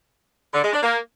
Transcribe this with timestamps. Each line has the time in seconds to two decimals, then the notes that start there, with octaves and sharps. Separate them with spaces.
0.53 D3
0.63 G#3
0.73 D4
0.83 A#3